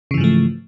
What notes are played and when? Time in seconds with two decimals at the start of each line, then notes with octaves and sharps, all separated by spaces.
0.11 C#3
0.14 E3
0.17 G#2
0.21 F3
0.24 A3